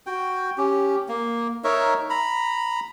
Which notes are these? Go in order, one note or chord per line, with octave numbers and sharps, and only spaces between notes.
F#4 G5
C#4 G4
A#3
D#4 A#4 C#5 E5
A#5 B5